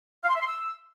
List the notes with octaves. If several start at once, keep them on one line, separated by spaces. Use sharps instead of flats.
F5
C6
E5
C6
E6